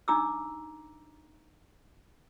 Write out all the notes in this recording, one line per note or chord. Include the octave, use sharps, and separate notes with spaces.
D4 D#4 A#5 D6 E6